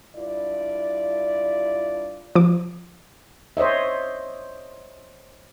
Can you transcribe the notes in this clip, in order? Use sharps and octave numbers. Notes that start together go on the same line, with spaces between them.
G2 D4 E4 F4 D5
F3 D6
C5 C#5 D#5 E5